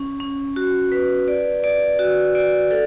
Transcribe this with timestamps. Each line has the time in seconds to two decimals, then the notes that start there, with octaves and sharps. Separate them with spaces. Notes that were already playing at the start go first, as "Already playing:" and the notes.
Already playing: C#4
0.20 C#4
0.56 F#4
0.92 B4
1.28 D5
1.64 D5
1.99 F#4
2.35 D5
2.71 A4